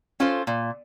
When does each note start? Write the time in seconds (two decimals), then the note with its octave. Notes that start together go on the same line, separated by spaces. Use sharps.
0.20 C#4 F4 A4 C5
0.47 A#2